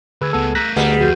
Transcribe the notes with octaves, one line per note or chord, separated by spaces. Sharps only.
D2 G#4 B4 E6 G#6
C#2 G#3 A3 B3 A4
A3 A#4 A#5 F#6 G6 A#6 B6
D2 G3 G#3 B4 F#5
F2 F#4 G4 G6